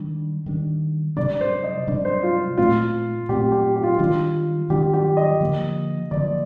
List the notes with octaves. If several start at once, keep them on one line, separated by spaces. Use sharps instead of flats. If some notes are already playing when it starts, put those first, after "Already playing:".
Already playing: D#3 G3 D4
D#3 G3 D4
C3 G3 D4 D5
C5
D#5
C3 G3 D4 D5
C5
F4
A#2 A3 C4 F4
A#2 A3 C4 G4
G4
G4
F4
D#3 G3 D4 F4
D#3 G3 D4 G4
G4
D#5
D3 F3 A#3
D3 F3 A#3 D5